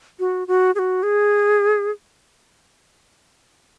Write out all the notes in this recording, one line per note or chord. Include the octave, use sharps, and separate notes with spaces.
F#4
F#4
G#4
F#4
G#4